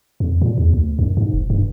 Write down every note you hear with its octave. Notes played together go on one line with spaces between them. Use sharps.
F2
A#2
E2
D2
F#2
G#2
D#1
G2